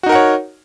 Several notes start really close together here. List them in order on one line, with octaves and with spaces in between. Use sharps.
F#4 D#4 A#4 F#5 C#5